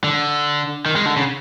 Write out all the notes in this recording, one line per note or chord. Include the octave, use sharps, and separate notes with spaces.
D3
D#3
G#3
D3
C#3